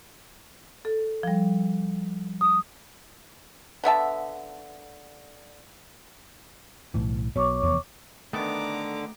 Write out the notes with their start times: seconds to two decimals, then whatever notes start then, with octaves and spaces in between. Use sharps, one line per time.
0.85 A4
1.23 F3 G3
2.41 D#6
3.84 D3 B3 E5 A5
6.94 B1 A2 E3
7.36 B1 B2 C#5 C#6 D6
7.63 F1 E2 B3
8.33 D3 D#3 A3 B3 A4 A#5 D6